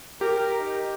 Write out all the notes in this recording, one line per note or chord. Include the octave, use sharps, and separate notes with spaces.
G4 A#4
D#4